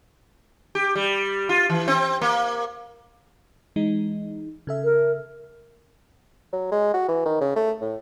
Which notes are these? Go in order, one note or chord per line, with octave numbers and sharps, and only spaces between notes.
G4
G3
F4
E3
C4
A#3
E3 G#3 D#4
C#3 A4 E5
A#4
F#3
G#3
F#4
E3
D#3
C#3
A3
A2